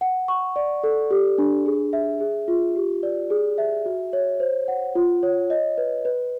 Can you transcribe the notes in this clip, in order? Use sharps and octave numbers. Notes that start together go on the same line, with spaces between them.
F#5
C#6
D5
A4
G4
D4
G#4
E5
G#4
F4
G4
D5
G#4
E5
F#4
C#5
C5
F#5
F4
C#5
D#5
B4
B4